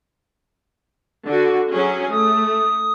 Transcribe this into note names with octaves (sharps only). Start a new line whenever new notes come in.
D3 F#4
F#3 C#4 G#4
A3 D#6